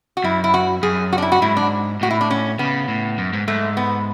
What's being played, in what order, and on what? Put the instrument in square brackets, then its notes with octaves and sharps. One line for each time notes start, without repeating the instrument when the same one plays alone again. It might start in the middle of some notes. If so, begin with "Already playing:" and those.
[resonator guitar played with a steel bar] F#4
[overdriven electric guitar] F#2 [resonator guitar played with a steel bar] E4
[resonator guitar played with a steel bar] E4
F#4
[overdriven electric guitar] F#2 [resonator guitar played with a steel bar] G#4
[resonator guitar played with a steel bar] F#4
D4
E4
F#4
[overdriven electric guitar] G#2 [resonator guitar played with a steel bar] E4
[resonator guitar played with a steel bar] D4
[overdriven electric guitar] A2 [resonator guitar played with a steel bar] F#4
[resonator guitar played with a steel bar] E4
D4
C#4
[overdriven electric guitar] C#3 [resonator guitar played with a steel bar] B3
[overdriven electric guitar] A2
F#2
G#2
[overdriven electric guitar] G#2 [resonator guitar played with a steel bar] A3
[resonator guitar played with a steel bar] B3